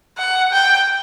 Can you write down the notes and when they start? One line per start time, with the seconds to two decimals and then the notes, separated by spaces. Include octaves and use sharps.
0.18 F#5
0.52 G5